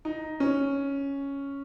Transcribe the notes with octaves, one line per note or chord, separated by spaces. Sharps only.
D#4
C#4